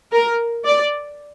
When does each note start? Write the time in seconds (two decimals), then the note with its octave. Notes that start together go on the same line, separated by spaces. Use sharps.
0.12 A#4
0.65 D5